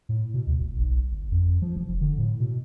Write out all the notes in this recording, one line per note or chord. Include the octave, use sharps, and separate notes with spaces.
A2
B2
D2
F#1
B1
G1
F2
F3
F1
D3
A2
B2